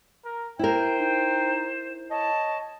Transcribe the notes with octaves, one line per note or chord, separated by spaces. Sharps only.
A#4
E4 A#4 C5 G5
D#4
C#5 D#5 A5